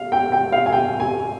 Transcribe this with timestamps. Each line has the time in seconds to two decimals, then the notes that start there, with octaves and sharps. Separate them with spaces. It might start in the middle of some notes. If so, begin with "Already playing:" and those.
Already playing: F5
0.12 G5
0.32 G5
0.52 F5
0.66 G#5
0.73 G5
1.00 G#5